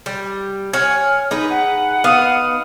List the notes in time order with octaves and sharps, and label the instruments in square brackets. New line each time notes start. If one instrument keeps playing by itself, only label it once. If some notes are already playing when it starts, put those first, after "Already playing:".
[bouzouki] G3
[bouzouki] C#5 F#5 G#5 [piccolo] F6
[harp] D#4 [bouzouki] G#4 B4
[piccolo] F#5
[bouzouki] B3 [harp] F5 D#6